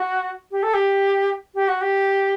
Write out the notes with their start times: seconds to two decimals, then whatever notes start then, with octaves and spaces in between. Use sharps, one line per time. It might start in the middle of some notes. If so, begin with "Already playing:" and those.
Already playing: F#4
0.51 G4
0.63 A4
0.74 G4
1.55 G4
1.68 F#4
1.81 G4